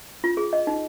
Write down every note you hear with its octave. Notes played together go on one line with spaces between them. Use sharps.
F4
G#4
D#5
D#4